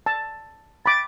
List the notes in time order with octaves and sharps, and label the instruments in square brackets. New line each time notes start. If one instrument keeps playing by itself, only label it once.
[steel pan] A5
[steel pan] B5 D6 [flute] A6